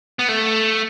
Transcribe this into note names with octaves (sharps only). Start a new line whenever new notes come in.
B3
A3